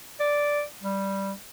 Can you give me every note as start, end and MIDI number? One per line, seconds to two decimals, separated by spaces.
0.20 0.62 74
0.83 1.32 55